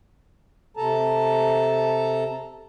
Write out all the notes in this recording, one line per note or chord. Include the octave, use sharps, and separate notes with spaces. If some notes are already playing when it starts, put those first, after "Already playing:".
C3 A4 A5 A#5